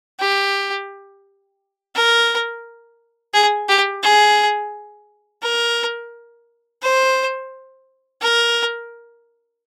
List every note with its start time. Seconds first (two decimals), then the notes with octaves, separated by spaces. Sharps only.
0.19 G4
1.95 A#4
3.34 G#4
3.69 G4
4.03 G#4
5.42 A#4
6.82 C5
8.21 A#4